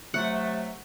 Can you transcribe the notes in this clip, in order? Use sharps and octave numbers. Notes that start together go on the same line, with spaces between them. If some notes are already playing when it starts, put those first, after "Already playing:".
C3 F#3 A3 F#5